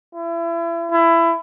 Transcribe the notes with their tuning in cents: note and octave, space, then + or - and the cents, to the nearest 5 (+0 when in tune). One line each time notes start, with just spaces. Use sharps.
E4 +35
E4 +20